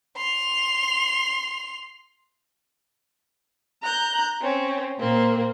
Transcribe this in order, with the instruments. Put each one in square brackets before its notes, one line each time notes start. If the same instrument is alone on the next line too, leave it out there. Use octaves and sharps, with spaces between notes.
[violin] C6 F7
[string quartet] A#5 F#6 G6
C4 C#4
A#2 A#3 C4